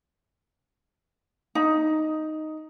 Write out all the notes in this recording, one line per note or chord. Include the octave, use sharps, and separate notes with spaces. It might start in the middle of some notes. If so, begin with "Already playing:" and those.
D#4